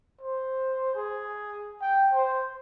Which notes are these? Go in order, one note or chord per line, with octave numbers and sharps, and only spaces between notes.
C5
G#4
G5
C5